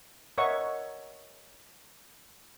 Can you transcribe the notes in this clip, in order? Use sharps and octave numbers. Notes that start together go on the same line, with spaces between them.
A#4 C#5 D#5 E5 F#5 C#6